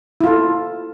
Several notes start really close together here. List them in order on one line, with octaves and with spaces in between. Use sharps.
E4 F4 A4